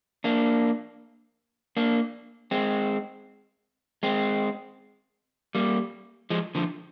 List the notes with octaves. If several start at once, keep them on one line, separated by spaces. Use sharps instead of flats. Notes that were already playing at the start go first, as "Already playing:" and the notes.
A#3 D4
A#3 D4
G#3 C4
G#3 C4
G3 A#3
F3 G#3
D3 F3